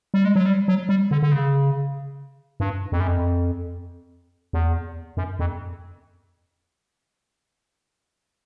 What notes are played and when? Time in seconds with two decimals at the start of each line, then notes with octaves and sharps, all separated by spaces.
0.14 G3
0.25 G#3
0.35 F#3
0.46 G3
0.68 F#3
0.89 G3
1.11 D3
1.22 D3
1.32 C#3
2.60 G2
2.92 F2
3.00 F#2
3.08 F2
4.53 E2
5.17 F#2
5.39 F2